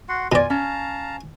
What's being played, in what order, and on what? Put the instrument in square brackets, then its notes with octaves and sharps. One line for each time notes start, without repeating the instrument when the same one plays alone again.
[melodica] F#4 F#5 C6
[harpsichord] B2 D5 [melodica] F4 [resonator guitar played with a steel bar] G#5
[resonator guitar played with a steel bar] C#4 [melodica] F5 A5 A#5